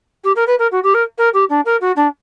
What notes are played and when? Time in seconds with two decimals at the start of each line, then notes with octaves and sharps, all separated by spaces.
0.24 G4
0.36 A#4
0.47 B4
0.59 A#4
0.72 F#4
0.83 G4
0.94 A#4
1.18 A#4
1.34 G4
1.50 D4
1.65 A#4
1.81 F#4
1.96 D4